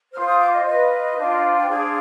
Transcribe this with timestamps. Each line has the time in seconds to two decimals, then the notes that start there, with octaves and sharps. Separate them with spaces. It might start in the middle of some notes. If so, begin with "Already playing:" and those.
0.13 C5 F6
0.18 F4
0.26 D#6
0.39 D6
0.52 D#5
0.65 F4 B4 D#5
1.17 D4 F4 C5
1.58 G5
1.69 D4 G#4 C5 F5